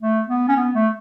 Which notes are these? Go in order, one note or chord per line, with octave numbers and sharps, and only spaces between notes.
A3
B3
C#4
B3
A3